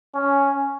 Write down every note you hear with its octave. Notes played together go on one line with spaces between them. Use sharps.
C#4